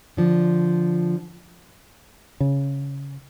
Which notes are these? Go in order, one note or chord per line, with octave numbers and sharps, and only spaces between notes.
D3 F3
C#3